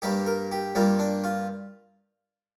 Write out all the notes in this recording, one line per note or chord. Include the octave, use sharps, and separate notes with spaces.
G2 G3 A#3 G4
A#4
G4
G2 G3 A#3 F4
D4
F4